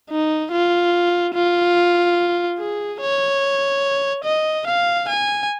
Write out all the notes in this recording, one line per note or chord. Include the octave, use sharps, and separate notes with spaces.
D#4
F4
F4
G#4
C#5
D#5
F5
G#5